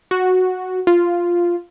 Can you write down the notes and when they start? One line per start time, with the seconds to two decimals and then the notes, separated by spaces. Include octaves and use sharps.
0.11 F#4
0.87 F4